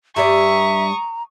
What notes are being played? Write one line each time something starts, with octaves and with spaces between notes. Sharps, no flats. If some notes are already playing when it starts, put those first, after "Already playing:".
G2 G4 D5 E5 A#5 C#6 D#6